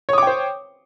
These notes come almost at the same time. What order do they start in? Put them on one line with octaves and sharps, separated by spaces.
C#5 D#6 D6 G5 C5